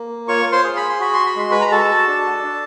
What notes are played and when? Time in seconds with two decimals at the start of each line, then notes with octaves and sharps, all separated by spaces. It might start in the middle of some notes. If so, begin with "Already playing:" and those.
Already playing: A#3
0.28 F4 C#5 C#6
0.52 C5 C6
0.64 G#4
0.76 B5
0.89 C6
1.00 F#4 B5
1.14 C6
1.26 B5
1.36 G#3 C6
1.51 B4 B5
1.61 A#5
1.72 F#4 A4 A5
2.07 D4
2.44 D4